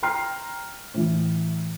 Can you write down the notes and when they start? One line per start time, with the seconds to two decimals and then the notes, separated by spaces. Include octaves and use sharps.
0.03 G5 A#5 C6 F6 C7
0.94 A2 E3